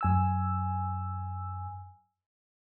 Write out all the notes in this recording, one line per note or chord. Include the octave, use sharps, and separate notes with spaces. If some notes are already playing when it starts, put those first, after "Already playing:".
F#2 G#5 E6